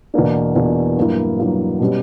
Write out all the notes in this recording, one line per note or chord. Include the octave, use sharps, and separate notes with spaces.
E2 B2 A#3 D4
E2 B2 A#3 D4
G2 F#3 A#3 E4
G2 F#3 A#3 E4
B2 G3 C#4 G4